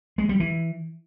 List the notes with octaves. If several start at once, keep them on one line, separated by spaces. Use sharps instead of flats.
G#3
G3
E3